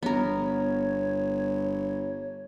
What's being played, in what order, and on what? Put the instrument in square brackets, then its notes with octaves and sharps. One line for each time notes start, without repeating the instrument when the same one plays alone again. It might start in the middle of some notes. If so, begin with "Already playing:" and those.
[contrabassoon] G1 [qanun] B3 A#4 [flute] C#5